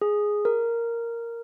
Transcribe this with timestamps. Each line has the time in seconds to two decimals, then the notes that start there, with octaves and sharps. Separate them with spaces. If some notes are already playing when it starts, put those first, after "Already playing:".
0.01 G#4
0.45 A#4